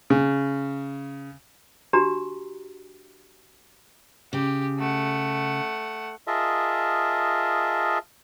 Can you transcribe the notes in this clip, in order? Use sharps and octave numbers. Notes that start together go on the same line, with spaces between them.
C#3
D4 F#4 G4 A#5
C#3 G4
A3 F#5
F4 G#4 A#4 D#5 E5 A5